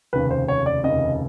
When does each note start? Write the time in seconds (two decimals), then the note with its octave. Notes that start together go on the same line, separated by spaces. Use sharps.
0.13 F1 D#2 C#3 B4
0.31 C5
0.48 C#5
0.66 D5
0.84 F1 D#2 C#3 D#5